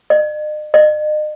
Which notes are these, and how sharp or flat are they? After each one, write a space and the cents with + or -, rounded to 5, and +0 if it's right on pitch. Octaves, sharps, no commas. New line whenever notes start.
D#5 -45
D#5 -40